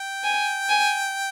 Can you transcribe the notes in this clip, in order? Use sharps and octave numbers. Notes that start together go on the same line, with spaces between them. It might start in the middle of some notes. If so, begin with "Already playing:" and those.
Already playing: G5
G#5
G#5